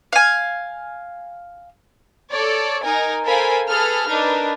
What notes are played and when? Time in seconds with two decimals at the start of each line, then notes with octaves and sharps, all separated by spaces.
0.12 F5 G#5
2.30 A4 C#5 D5
2.83 D#4 A#4 G#5
3.25 A4 A#4 C5 F5 G#5 B5
3.68 G#4 A4 B4 F6
4.09 D4 D#4 A#4 B4